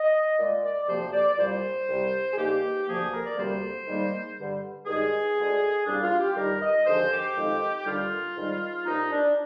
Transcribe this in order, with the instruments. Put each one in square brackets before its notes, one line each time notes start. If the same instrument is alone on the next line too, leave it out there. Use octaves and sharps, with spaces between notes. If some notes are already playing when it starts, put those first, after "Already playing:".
Already playing: [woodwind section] D#5
A#2 G#3 D5
D5
D2 C3 F3 A#3 C5
D5
C2 A#2 G3 C5
C2 C3 G3
G#4
G2 D#3 A#3 G4
D2 C3 F3 A#3 G#4
A#4
D5
D2 C3 G3 A#3 C5
G#2 D#3 G3 A#3
G2 D3 G3
G2 D#3 G#3 G#4
D2 D3 G#3
C2 A#2 G3 A#3 D4
F4
G4
G2 D#3 G3 A#4
D#5
D#2 D3 F3 G#3 C5
G4
F2 D#3 G#3
D#2 D3 G3 F4
G#2 D#3 G3
G2 F3 A#3 D#4
D4